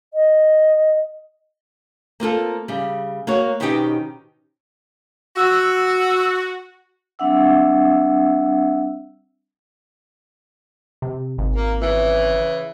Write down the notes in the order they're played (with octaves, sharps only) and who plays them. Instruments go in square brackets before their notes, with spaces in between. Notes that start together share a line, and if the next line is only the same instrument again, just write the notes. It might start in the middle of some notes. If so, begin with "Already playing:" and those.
[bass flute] D#5
[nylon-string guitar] A#3 C4 F4 A4
C#3 G3
A#3 F#4 C#5
B2 D#3 C4 C#4 D#4 G4
[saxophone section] F#4 [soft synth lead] E6
[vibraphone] G3 C4 D4 E5 F#5 E6
[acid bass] C3
G#1
[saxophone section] A#3
C#3 E3